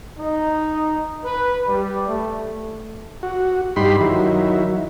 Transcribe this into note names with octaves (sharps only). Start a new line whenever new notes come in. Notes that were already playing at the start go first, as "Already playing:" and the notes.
D#4
B4
G3
A3
F#4
G2 D#4 G4 B5 C6
D#3 F#3 E4